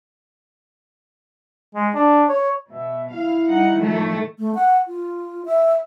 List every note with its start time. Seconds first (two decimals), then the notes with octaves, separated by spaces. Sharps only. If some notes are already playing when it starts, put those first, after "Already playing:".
1.75 G#3
1.95 D4
2.29 C#5
2.70 B2 E5
3.13 E4 F5
3.50 G3 D#4 F#5
3.81 A2 D#3 F3 A3
4.39 A3
4.55 F#5
4.88 F4
5.45 E5